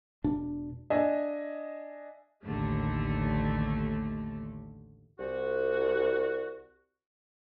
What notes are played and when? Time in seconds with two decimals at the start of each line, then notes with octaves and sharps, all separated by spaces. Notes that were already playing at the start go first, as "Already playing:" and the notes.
0.24 E1 B2 D4
0.90 D4 D#5 E5 G#5
2.45 A1 D#2 D3 A3
5.19 C2 F#4